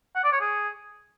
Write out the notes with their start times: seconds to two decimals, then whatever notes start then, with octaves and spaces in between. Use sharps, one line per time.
0.15 F#5
0.24 D5
0.32 C#5
0.41 G#4